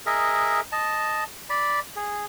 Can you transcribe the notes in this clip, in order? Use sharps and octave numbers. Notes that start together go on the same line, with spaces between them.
G#4 A#4 D#5 E5
D#5 A5
D5 B5
G#4